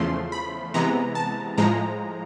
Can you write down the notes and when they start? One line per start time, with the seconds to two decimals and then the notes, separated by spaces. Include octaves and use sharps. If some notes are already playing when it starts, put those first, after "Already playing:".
Already playing: E2 C#3 F3 A3 C6
0.32 B5
0.74 C3 E3 G#3 B3 A#5
1.15 A5
1.58 A2 F3 G#3 A#5